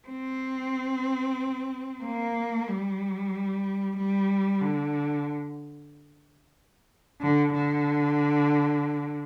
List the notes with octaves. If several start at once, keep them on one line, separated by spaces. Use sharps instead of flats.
C4
A#3
G3
G3
D3
D3
D3